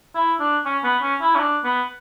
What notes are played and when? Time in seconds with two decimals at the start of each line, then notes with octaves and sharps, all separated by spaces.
0.15 E4
0.40 D4
0.65 C#4
0.84 B3
1.02 C#4
1.21 E4
1.35 C#4
1.40 D4
1.64 B3